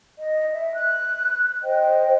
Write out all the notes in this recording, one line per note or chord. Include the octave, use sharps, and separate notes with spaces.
D#5
E5
F#6
C5 D#5 G5